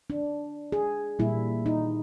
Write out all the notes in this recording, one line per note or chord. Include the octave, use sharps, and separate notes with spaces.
D4
G#4
A#2 G3 A#3 E4
D#4